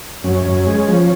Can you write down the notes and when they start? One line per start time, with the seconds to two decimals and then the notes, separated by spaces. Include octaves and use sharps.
0.24 F#2 C#4
0.46 F#2
0.67 G#3
0.87 F3